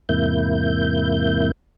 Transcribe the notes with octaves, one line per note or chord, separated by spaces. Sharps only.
E2 G#2 C3 A#3 E4 G6